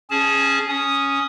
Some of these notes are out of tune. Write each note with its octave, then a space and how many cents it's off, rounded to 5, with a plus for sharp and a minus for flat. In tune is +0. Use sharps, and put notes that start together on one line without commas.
C#4 -10 G#4 +0 A5 -30
C#4 +0 D#6 +0